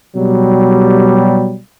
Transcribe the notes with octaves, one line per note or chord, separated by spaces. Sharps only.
B2 F#3 G3